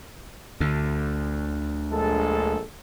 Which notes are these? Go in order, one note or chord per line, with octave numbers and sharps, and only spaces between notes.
D2 D3
A#1 G#3 A4